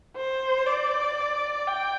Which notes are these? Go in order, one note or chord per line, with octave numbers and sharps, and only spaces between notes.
C5
D5
G5